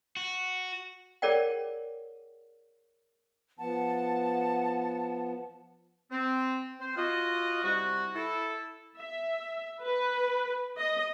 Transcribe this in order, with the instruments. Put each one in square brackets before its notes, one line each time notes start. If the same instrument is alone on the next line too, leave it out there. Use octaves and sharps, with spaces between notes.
[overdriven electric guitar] F#4
[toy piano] G#4 A#4 C#5 D5 F#5 G5
[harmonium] F3 B3 [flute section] F#5 A5
[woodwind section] C4
C4 C5
F4 F#4 D#5
C3 G3 E4 F#4
E4 A4
[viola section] E5
B4
D#5